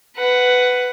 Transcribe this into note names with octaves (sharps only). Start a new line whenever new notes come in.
B4 F#5